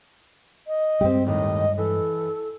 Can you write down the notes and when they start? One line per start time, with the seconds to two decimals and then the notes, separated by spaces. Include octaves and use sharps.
0.67 D#5
1.01 G2 G3 G#3 C4 G4
1.26 D#2 A2 D#3 D#5
1.78 E3 A4